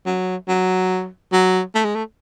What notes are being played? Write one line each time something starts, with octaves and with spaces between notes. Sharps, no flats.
F#3
F#3
F#3
A3
G#3
A3